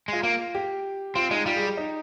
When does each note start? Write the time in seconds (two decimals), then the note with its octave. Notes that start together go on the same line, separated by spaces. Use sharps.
0.08 G#3 F4
0.23 A#3 F4
0.55 G4
1.15 C4 F4
1.31 G#3 D#4
1.46 G3 F4
1.56 G#4
1.67 G4
1.77 D#4